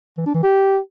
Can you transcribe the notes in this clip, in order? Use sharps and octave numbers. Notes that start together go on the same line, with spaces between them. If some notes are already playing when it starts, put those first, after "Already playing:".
E3
D4
E3
G4